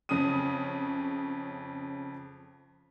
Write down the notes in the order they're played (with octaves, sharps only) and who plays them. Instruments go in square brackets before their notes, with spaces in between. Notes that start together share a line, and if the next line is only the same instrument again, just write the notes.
[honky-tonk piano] F2 C#3 C#4 D#6 D#7